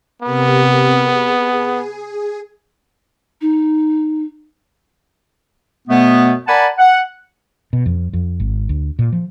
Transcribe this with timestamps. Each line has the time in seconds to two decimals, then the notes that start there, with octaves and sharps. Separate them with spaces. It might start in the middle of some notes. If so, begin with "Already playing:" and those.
0.22 C3 B3 G4 A#4
1.01 G#4
3.41 D#4
5.88 F#2 B2 A3 B3
6.47 A#4 D5 F#5 G#5 A5 B5
6.78 F#5
7.73 B2
7.86 F2
8.13 F2
8.40 G#1
8.69 D2
8.99 A#2
9.12 F3